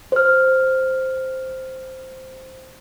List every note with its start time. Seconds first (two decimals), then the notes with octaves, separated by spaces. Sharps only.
0.12 C5 F6